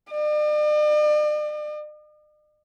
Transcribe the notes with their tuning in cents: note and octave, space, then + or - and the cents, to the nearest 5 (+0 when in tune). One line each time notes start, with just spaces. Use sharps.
D5 +45